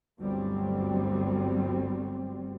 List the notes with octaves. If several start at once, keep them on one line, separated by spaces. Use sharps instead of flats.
G1 D2 F#3 G3 C4